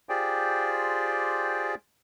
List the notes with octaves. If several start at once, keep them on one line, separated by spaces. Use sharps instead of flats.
F4 G4 G#4 C5 D5 G5